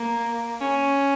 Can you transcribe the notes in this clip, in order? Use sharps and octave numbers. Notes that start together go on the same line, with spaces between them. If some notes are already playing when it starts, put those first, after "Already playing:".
Already playing: A#3
C#4